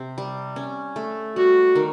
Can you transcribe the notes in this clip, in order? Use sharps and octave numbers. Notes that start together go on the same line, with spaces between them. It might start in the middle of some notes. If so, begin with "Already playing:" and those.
Already playing: C3 C4
G3
C#4
A3
G3 F#4
D#3